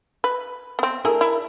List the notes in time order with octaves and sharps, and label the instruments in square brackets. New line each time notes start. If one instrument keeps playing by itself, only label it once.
[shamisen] B4
B3 C4
[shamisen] A3 E4 G#4 [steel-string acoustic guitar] D4 A#4
[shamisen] E4